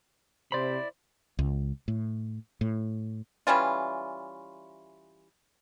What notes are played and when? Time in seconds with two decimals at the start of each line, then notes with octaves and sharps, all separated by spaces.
0.52 C3 E4 C5 D5 B5
1.39 C#2
1.88 A2
2.61 A2
3.47 E3 G3 C#4 F4